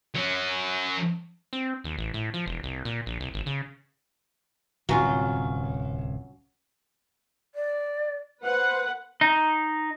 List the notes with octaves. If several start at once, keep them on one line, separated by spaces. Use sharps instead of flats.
F#3 C#4
C4
D#2
A1
A2
F3
E1
C2
A#2
A#1
C2
G#1
C#3
D1 C2 F#3 C#4 F4
D5
B4 C5 F#5
D#4